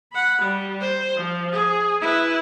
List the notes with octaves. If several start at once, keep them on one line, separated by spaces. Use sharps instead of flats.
F#5 B5
G3
C5
F3
G#4
E4 B4